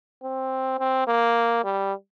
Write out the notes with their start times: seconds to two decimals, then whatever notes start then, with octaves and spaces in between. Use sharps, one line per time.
0.23 C4
0.79 C4
1.07 A#3
1.64 G3